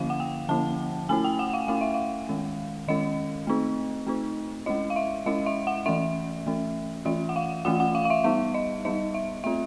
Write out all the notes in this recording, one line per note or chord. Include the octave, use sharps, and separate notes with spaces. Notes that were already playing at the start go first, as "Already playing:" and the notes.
Already playing: D3 F3 A#3 C#4 E4 F5
F#5
G5
D3 F3 A#3 C#4 E4 A5
A3 C#4 E4 G#5
G5
F#5
F5
A3 C#4 E4 F5
E5
F5
D#3 G#3 C#4
D#3 G#3 C#4 D#5
A3 C4 D#4
A3 C4 D#4
G#3 C#4 E4 D#5
F5
E5
G#3 C#4 E4 D#5
E5
F#5
E3 A3 C#4 E5
E3 A3 C#4
E3 A3 C#4 F4 E5
F#5
F5
E3 A3 C#4 F4 F#5
F#5
F5
F5
E5
G3 B3 D#4 E5
D#5
G3 B3 D#4 D#5
E5
A3 C4 F4 E5